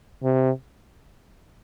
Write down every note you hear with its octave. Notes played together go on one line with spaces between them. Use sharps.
C3